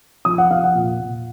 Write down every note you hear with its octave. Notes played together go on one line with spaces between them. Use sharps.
F3 D#6
F#5
F3 F5
F#5
A#2
A#2